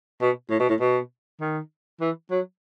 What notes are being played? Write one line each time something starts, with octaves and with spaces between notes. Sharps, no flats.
B2
A2
B2
A2
B2
D#3
E3
F#3